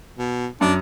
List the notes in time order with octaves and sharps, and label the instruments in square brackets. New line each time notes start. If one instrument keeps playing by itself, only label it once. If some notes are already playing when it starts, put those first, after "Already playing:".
[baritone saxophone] B2
[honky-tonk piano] F#2 [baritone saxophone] D4